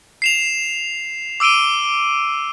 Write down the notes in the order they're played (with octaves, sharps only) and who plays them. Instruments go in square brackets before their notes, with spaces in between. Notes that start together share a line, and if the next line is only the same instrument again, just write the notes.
[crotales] C7 E7 F7
D6 E6 D7 D#7 G7